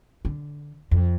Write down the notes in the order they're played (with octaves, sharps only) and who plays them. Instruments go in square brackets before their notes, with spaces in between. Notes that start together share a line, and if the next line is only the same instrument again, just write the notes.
[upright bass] D3
F2